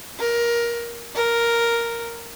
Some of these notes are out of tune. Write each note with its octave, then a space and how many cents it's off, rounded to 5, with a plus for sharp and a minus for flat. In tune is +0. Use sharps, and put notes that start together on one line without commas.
A#4 +15
A#4 +0